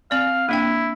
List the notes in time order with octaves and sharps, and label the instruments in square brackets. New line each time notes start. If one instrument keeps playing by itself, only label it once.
[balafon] C4 D5 [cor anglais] F5
[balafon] A#3 D4 G5 [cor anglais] E4